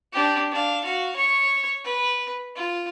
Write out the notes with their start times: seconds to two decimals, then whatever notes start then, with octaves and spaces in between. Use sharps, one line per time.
0.12 D4 G4
0.51 D4 F5
0.84 F#4 F5
1.15 C#5 C#6
1.85 B4
2.56 F4